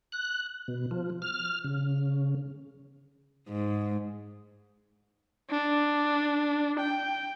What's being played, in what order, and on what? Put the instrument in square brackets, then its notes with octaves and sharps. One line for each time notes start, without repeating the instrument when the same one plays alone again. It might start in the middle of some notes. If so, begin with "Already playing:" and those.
[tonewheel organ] F#6
B2
F3
F6
C#3
[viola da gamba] G#2
[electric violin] D4
G5